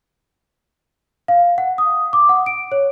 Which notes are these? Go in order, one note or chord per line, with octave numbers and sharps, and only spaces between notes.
F5
F#5
D#6
D6
F#5
D7
C#5